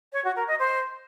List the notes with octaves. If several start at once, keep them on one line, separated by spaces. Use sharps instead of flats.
C#5
F#4
A#4
D#5
C5